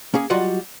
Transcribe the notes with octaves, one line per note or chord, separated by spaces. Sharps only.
A#3 C#4 G#4
F#3 G3 F4 F#4 D#5 F#5